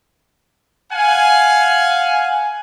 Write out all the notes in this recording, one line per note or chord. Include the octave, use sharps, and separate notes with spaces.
F5 F#5 G#5